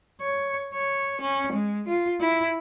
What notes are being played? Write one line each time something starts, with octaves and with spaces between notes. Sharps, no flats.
C#5
C#5
C#4
G#3
F4
E4